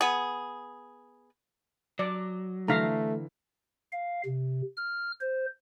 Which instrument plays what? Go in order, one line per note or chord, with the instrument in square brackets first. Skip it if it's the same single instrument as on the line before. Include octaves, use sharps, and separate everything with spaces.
[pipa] B3 G#4
[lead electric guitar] F#3 [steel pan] D5
[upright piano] D3 E3 B6 [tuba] A3 [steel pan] F5 A#5
[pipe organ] F5
C3
F6
C5